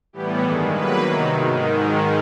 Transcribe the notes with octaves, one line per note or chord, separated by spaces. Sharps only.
A2 E3 G3 B3 G4
G2 D#3 G#3 A4
B2 F#3 A#3 B4
C3 D#3 F#3
G#2 D#3